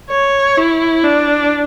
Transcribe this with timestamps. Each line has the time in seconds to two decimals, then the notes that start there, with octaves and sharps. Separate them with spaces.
0.10 C#5
0.58 E4
1.04 D4